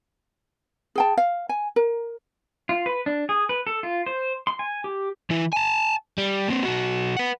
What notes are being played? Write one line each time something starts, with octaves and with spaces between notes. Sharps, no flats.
G#4 G5 A5
F5
G#5
A#4
F4
B4
D4
G#4
B4
A4
F4
C5
C6
G#5
G4
E3 E4
G#5 A5
G3
A#3 C4
B1 F#4
B4 F#5